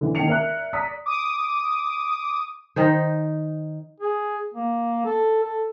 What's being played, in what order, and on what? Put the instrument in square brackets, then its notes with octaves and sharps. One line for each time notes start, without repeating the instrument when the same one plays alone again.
[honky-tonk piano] D3 E3
D#3 A#3 G5 C7 C#7 F7
A#4 D5 E5 F#6
D5 A#5 D#6 B6
[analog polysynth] D6 D#6
[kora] D#3 D#4 C5
[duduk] G#4
A#3
A4
A4